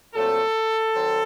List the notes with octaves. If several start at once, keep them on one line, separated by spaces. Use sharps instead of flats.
A#2 F#3 A3 C4 A4
D#3 F#3 C4